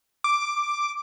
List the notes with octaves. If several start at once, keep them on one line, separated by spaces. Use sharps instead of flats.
D6